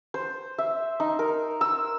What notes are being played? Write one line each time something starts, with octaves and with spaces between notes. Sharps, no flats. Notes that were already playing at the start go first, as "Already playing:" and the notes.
C5
E5
D#4
A#4
E6